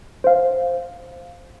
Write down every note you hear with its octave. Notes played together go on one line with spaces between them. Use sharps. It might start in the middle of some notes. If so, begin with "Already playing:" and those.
C5 F5